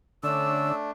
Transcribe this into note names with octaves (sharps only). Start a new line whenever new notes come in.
D3 A3 C#4 D4 E6